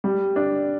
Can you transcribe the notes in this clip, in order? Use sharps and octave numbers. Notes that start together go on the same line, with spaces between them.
G3
D4